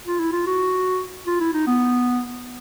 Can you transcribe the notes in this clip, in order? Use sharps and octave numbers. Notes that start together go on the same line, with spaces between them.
F4
E4
F4
F#4
F4
E4
D#4
B3